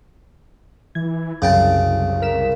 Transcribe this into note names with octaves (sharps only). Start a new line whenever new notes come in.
E3 G#6
C2 F#2 C#3 G5 A5
A#4 B6 E7